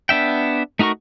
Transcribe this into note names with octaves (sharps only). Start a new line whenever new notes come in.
B3 D4 E5 G5
A3 D#4 F#4 A#4 C#6